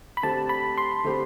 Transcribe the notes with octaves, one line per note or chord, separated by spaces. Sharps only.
B5
D3 A3 C4 G4 A5
B5
C6
D3 A3 C4 G4